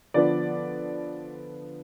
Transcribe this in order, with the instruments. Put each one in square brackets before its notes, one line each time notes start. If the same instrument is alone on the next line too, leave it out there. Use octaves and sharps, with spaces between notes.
[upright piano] D3 F3 B3 D5